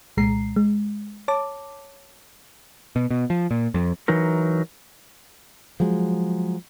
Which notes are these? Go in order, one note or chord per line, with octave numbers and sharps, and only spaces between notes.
C2 A#2 G#3 A#5 C7
G#3
C#5 A5 D6
B2
B2
F3
A#2
F2
E3 F#3 D#4 A#4
F3 F#3 G#3